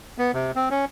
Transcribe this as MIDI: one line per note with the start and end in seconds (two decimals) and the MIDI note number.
0.18 0.31 59
0.34 0.51 48
0.56 0.69 60
0.71 0.85 61